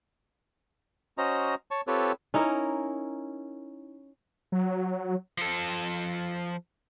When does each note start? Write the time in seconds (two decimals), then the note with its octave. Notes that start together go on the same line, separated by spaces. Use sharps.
1.18 C#4 F#4 C5 D#5 A#5
1.71 C#5 A5 C#6
1.87 C4 F4 G4 A4 B4 C#5
2.34 C#4 D#4 E4 A#4
4.52 F#3
5.38 F3 A4